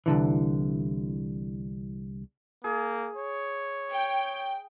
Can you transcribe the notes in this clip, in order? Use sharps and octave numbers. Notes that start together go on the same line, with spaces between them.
C2 D3 E3
A#3 G#4
C#5
G5